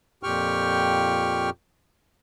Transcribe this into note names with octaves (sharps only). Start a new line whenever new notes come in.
F2 A#2 G4 G5 C#6 F6